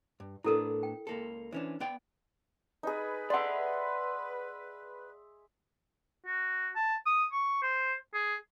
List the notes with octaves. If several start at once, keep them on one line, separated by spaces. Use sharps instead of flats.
G2
A2 B3 D4 E4 A4 A#4
G5
C#2 A#3 A4
E3 C#4 D4 C5
B3 D5 G5
D#4 G#4 B4
D5 E5 F#5 C6
F#4
A5
D#6
C#6
C5
G#4